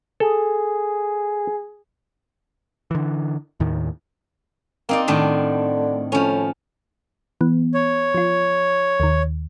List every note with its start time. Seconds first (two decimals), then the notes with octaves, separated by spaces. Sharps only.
0.20 G#4 A4
2.91 D3 E3
3.60 D#2 A2 D#3
4.89 A#3 C4 D#4 D5
5.08 A2 D3 D#3 D4
6.12 A2 F3 C#4
7.41 E3 B3
7.74 C#5
8.15 F3 F4
9.00 D#2 D#3